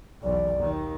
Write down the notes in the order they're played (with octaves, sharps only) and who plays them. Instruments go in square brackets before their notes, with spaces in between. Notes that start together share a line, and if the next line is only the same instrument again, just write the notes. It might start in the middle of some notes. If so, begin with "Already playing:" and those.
[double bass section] B1 E2 B2 [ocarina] D5
[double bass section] D#2 D#3